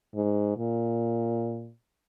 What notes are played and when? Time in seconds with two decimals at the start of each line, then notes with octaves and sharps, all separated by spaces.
0.15 G#2
0.58 A#2